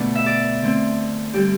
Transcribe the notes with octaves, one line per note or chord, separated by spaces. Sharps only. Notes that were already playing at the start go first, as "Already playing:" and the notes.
Already playing: B2 D3 A3 D4
E5
D5
D3 A3 C4
D3 G3 G4